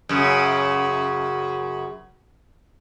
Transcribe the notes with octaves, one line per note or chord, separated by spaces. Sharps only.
F#2 C#3